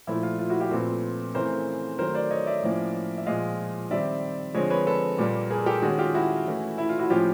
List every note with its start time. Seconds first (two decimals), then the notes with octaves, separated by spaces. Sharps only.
0.07 A#2 F3 A3 E4
0.23 F4
0.39 F4
0.49 E4 F#4
0.60 F4 G4
0.71 A#2 F3 A3 C4 A4 B4
1.35 C#3 E3 A3 C4 A#4 C5
1.99 D#3 F#3 A3 A#4 C5
2.15 C5 D5
2.31 C#5 D#5
2.47 D5 E5
2.63 A2 F3 A#3 C#4
3.18 E5
3.26 A#2 F3 G#3 D#5 F5
3.91 D#3 G3 C4 D5 E5
4.54 D3 F3 G#3 C4 C#5 D#5
4.70 B4 C#5
4.87 A4 B4
5.18 A#2 G3 A#3
5.50 G#4 A#4
5.66 G4 A4
5.82 D#3 G#3 C#4 F#4 G#4
5.98 F4 G4
6.14 E4 F#4
6.46 E3 A3 C#4
6.78 E4
6.89 F4
6.99 E4 F#4
7.10 A2 F3 A#3 C#4 F4 G4